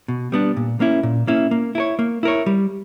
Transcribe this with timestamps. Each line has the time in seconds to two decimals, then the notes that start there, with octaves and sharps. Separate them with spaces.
0.08 B2
0.32 G3 B3 D4
0.57 A#2
0.80 A#3 C#4 E4
1.03 A#2
1.27 A#3 C#4 E4
1.51 A#3
1.75 E4 A#4 C#5
1.99 A#3
2.23 E4 A#4 C#5
2.46 G3